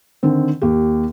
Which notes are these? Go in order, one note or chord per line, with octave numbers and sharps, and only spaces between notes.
D3 D#3 C4
D#2 G4